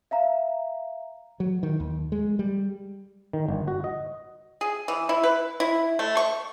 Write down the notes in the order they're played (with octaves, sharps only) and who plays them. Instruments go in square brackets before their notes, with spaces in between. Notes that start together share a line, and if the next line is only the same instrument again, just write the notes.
[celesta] E5 F5 A#5
[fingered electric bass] F#3
D#3
D#2
G#3
G3
[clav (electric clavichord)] D#3
G1
F#4
D#5
[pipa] G#4
E3
E4
B4
E4
A3
C#6